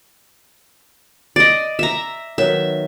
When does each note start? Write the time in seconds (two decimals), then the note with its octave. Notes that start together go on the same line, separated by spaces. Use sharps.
1.36 D5 D#5
1.79 E5 A#5
2.38 D#3 F#3 B3 E5